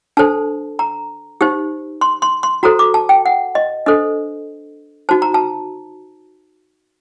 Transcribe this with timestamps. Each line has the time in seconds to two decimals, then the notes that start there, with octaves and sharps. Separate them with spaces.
0.17 D4 A4 C5 A5
0.79 A#5
1.41 D#4 G4 C5
2.01 C6
2.22 C6
2.43 C6
2.63 F#4 A4 C5 A#5
2.79 D6
2.94 A5
3.09 G5
3.26 F#5
3.55 D#5
3.86 D4 A4 C5 D#5
5.09 D#4 F#4 C5 A5
5.22 A#5
5.34 A5